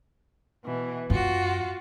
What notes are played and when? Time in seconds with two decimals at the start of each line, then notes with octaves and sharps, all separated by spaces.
0.64 B2 E3
1.10 F#2 F4 F#4